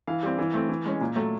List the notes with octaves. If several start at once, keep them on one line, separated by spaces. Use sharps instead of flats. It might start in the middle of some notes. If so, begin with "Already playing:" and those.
E3 F5
G3 C4
E3
A3 C4
E3
G#3 C#4
A#2
F#3 A3